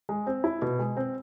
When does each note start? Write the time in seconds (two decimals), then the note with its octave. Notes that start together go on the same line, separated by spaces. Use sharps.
0.09 G#3
0.27 C4
0.44 E4
0.62 B2
0.79 G#3
0.97 C4